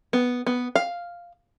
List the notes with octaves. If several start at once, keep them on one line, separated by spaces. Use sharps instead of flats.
B3
B3
F5